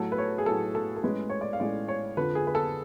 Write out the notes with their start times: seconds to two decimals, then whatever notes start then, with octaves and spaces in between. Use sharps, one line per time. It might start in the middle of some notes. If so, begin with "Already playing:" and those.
Already playing: A2 F#3 A3 A4
0.12 B4
0.18 C#5
0.38 G#4
0.46 A2 F#3 A3 A4
0.75 A4
0.96 A4
1.03 A2 G#3 C#4 B4
1.29 C#5
1.41 D5
1.53 F5
1.60 A2 G#3 C#4 D5
1.88 C#5
2.17 F2 D3 F3 B4
2.35 G#4
2.47 B4
2.55 A4